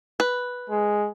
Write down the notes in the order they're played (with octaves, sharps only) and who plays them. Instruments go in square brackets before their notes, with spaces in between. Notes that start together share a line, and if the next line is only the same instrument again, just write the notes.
[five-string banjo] B4
[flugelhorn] G#3